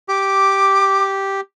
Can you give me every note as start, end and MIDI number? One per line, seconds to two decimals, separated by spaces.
0.08 1.41 67
0.08 1.11 86